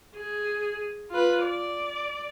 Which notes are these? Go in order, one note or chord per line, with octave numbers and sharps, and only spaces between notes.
G#4
F4 B4
D5